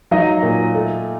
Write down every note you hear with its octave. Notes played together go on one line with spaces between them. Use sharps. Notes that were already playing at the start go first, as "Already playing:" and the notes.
F#3 D#4 D#5
A#2
A3